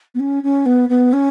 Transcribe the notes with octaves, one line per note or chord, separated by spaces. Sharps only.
B3
C#4
C#4
B3
B3
C#4